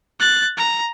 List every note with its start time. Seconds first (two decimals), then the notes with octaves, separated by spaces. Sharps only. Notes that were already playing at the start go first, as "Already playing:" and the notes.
0.20 F#6 A6
0.57 A#5